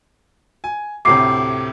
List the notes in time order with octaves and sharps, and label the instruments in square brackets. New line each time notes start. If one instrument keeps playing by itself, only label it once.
[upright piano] G#5
[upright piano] D2 A2 C3 [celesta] D6 C7